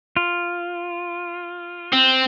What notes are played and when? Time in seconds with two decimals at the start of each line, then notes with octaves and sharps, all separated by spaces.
0.16 F4
1.93 C4